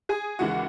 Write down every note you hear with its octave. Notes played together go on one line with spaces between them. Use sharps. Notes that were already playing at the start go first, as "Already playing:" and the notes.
G#4 G#5
D#2 C#3 E3 G#3 F#4 F#5